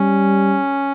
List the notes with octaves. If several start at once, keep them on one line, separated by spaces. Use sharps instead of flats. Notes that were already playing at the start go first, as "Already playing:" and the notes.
Already playing: G3 C#4